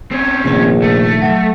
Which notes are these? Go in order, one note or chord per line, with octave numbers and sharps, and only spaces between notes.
C4 C#4
F1 A#1 A#2 D#3
A3
F#3